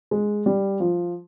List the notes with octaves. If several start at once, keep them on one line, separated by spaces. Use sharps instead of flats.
G#3
G3
F3